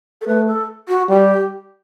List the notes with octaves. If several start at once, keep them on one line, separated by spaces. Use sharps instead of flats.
A4
A3 B4
A4
F#4
G3 G4